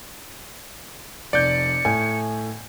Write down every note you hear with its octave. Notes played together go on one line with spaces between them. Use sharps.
F1 D5 G6 C#7
A2 G#5